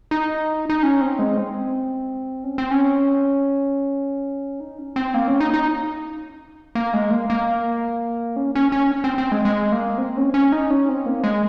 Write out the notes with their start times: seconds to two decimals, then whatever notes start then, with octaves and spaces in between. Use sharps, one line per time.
0.11 D#4
0.70 D#4
0.83 C#4
1.01 C4
1.19 G#3
1.37 C4
2.44 C#4
2.58 C4
2.71 C#4
4.60 D#4
4.78 C#4
4.96 C4
5.14 A#3
5.28 C#4
5.40 D#4
5.54 D#4
6.75 A#3
6.94 G#3
7.11 A#3
7.30 A#3
8.36 C#4
8.55 C#4
8.72 C#4
9.04 C4
9.18 C4
9.32 G#3
9.45 G#3
9.72 A#3
9.98 C4
10.17 C#4
10.34 C#4
10.52 D#4
10.70 C#4
10.89 C4
11.06 A#3
11.24 G#3